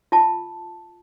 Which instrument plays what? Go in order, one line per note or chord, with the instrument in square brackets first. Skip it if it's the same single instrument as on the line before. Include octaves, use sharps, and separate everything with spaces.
[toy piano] F4 A5